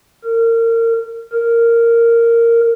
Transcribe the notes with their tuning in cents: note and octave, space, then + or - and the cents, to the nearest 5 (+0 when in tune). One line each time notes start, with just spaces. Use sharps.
A#4 -30
A#4 -10